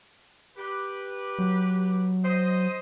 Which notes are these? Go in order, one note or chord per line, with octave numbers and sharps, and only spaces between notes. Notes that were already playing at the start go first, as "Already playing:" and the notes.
G4 B4
F#3
C5 D#5